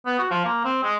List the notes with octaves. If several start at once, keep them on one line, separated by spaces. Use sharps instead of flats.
B3
F#4
F3
A#3
C4
G#3